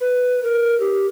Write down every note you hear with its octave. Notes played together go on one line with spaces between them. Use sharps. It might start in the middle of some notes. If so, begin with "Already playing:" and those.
B4
A#4
G4